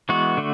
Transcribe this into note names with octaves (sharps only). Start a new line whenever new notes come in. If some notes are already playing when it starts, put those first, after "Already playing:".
E3 G#3 B3 F#4
D3 A3